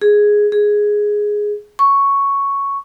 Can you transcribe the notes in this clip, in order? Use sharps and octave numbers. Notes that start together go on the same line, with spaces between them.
G#4
G#4
C#6